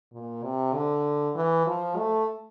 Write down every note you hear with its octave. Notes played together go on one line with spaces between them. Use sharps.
A#2
C3
D3
E3
F3
A3